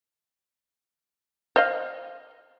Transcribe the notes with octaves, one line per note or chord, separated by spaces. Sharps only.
C5 D#5 F5